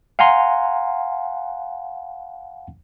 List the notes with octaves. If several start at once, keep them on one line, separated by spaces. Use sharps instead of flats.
F5 F#5 G#5 A#5 C6